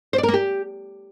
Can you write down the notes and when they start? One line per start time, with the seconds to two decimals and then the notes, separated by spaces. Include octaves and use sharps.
0.13 C5
0.18 D5
0.23 A#4
0.28 A#3
0.34 G4